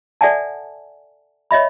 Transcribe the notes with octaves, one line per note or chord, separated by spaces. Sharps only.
A4 D5 E5 F#5 G#5 A5
C#5 D#5 E5 B5